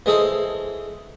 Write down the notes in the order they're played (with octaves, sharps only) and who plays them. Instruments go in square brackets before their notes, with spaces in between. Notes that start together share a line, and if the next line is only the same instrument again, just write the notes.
[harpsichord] E3 G#3 G#4 A4 C5